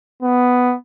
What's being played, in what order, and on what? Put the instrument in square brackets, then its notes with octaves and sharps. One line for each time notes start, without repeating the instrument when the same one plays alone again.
[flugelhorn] B3